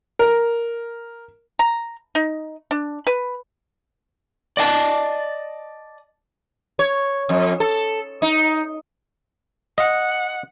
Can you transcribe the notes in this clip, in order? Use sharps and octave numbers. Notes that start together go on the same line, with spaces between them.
A#4
A#5
D#4
D4
B4
D5 D#5 F5 A5
C#5
F2
A4
D#4
D#5 F#5